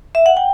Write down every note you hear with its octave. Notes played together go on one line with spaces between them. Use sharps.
E5
F#5
G5